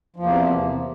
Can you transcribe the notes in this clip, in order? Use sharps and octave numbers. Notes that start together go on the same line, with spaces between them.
E2 C3 F3 A#3